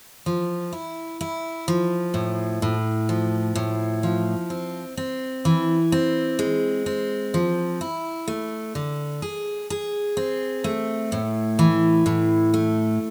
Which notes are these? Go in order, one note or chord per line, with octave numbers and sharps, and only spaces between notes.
F3
E4
E4
F3
A2
A2
F3
A2
F3
C4
C4
E3
C4
G#3
C4
F3
E4
A3
D3
G#4
G#4
C4
A3
A2
E3
A2
A3